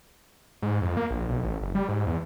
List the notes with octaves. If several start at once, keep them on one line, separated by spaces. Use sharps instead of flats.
G#2
F2
A#3
A#1
B1
A1
F#1
G3
G#2
E2